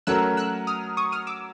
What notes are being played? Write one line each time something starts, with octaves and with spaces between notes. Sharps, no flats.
F#3 A3 C#4 F#4 A#4 E6 F#6
E6 F#6
D#6 F6
C#6 D#6
D#6 F6
D6 E6